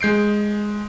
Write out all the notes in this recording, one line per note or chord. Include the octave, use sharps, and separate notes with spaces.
G#3 G6 C7 D7